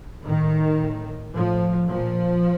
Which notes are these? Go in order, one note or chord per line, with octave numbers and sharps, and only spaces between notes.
A2 D#3
A2
A2 F3
A#2 F3